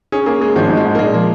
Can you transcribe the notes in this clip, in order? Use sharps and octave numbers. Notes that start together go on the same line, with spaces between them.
C#4 G#4
A#3 G#4
G#3 G#4
G#1 F3
G#2
F3
G#2
A#3
A#2 G#3
F3 A#3